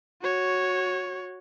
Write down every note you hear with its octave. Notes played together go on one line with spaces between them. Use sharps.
F#4 C#5